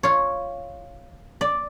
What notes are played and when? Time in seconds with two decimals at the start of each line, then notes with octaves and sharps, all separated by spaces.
0.03 F4 C#5
1.41 D5